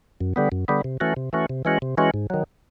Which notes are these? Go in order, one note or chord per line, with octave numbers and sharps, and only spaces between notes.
F#2
D3 G3 B3
F#2
D3 G3 B3
C3
E3 A3 C#4 F#4
C3
E3 A3 C#4 F#4
C3
E3 G#3 C#4 F#4
C3
E3 G#3 C#4 F#4
G#2
D#3 F#3